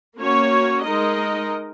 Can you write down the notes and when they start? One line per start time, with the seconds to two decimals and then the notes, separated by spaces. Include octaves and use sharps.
0.18 A#3 C#4 F#4 C#5
0.85 G#3 D#4 A#4 D#5